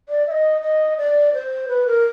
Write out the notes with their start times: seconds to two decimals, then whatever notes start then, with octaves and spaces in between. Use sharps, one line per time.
0.09 D5
0.27 E5
0.32 D#5
0.62 D#5
0.98 D5
1.34 C5
1.68 B4
1.87 A#4